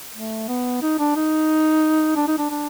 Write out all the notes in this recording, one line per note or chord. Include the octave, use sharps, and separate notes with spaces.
A3
B3
D#4
D4
D#4
D4
D#4
D4
D4